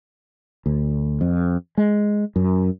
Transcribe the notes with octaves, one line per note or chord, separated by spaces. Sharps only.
D2
F2
G#3
F#2